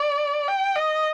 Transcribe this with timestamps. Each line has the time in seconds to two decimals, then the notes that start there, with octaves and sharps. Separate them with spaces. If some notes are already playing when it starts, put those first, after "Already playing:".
Already playing: D5
0.48 G5
0.75 D#5